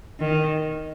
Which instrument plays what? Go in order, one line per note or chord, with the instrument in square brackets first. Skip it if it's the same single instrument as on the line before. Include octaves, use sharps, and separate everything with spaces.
[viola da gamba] D#3